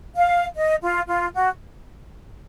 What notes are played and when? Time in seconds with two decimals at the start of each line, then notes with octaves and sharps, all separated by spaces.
0.16 F5
0.55 D#5
0.81 F4
1.08 F4
1.34 F#4